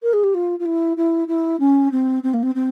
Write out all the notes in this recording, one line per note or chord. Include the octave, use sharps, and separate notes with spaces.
A#4
G#4
G4
F4
F4
E4
E4
E4
C#4
C4
C4
A#3
C4
C4